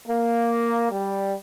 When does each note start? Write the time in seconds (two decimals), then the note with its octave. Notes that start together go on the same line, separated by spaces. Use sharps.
0.08 A#3
0.90 G3